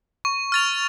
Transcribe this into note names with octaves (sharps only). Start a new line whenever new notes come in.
C#6
F6 A6 F7